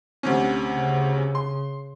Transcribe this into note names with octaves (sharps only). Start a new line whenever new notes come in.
D2 C3 C#4
C#3
C6